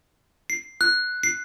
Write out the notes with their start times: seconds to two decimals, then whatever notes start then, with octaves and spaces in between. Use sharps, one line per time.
0.50 C7
0.81 F#6
1.23 C7